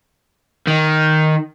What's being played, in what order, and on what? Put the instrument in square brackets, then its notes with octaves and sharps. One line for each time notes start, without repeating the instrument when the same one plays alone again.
[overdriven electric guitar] D#3